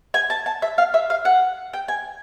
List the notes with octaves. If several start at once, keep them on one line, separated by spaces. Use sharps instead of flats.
G#5
A5
A5
E5
F5
E5
F5
F#5
G5
G#5